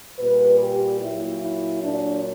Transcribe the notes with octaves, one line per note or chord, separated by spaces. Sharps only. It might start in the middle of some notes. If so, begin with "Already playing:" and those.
A#2 G3 B4
G4
A#2 F#3 E4
E4
A#2 F#3 D4